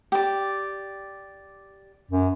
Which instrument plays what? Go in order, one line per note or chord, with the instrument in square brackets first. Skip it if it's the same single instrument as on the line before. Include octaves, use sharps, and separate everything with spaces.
[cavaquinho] G4 D5
[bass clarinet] F#2